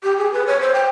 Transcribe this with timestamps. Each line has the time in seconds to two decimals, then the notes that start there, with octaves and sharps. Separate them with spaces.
0.04 G4
0.18 G#4
0.33 B4
0.47 C#5
0.61 C5
0.74 G5